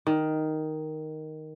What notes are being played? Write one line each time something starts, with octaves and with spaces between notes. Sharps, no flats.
D#3